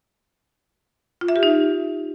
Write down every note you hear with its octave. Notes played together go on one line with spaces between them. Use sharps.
F4
E5
G4
D#4